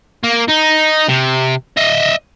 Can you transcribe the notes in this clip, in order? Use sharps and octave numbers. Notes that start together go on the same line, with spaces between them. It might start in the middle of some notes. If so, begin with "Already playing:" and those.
A#3
D#4
C3
D#5 E5